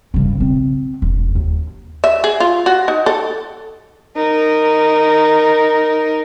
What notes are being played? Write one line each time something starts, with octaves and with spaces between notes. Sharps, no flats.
G2 C#3
B2 C4
E1
D#2
E5
G#4
F4
F#4
D#4
A4
D#4 A#4